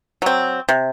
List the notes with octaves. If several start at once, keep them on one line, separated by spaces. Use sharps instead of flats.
F#3 C4
C3